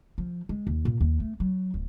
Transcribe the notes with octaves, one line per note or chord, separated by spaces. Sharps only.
F3
G#3
D#2
A#2
D#2
A3
F#3
D1